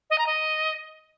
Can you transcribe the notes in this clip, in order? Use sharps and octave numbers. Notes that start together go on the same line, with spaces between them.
D#5
A#5
D#5